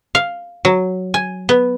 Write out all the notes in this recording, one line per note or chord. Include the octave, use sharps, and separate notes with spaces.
F5
F#3
G#5
B3